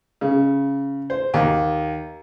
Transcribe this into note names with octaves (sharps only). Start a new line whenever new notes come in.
C#3
C5
D#2